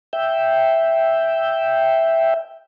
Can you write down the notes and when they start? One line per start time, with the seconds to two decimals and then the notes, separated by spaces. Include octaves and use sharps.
0.13 E5 G5